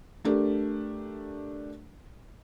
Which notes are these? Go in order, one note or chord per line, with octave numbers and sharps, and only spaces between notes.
A3 D4 G4 A#4